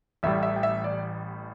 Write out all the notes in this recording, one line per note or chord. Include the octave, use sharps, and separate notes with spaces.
A1 A2 G3 E5
E5
G5
E5
D5